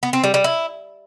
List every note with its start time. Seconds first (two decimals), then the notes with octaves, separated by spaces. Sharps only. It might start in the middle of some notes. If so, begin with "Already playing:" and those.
0.03 B3
0.13 C4
0.24 G3
0.34 G3
0.44 E4